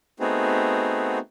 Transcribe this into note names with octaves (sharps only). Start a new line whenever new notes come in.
A3 B3 C4 D#4 F#4 G#4